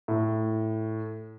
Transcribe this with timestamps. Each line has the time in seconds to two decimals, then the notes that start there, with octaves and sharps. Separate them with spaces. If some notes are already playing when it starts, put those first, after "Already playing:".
0.08 A2